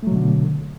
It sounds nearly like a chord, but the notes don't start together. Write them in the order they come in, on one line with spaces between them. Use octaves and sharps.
A3 F#3 B2 D3